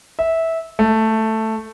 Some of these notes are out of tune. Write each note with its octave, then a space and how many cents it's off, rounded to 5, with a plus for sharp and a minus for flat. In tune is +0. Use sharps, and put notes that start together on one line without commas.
E5 -15
A3 +5